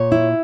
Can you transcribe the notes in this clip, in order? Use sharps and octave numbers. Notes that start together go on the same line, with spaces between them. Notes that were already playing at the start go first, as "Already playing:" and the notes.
Already playing: A#2 C#5
E4